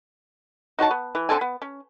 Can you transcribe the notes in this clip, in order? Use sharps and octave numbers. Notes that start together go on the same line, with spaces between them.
D#4 F#4 C#5 A5
B3
E3
D3 C4 A4 G#5
B3
C#4